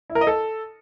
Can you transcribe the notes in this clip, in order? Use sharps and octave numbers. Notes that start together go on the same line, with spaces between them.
E4
A#4
D#5
A4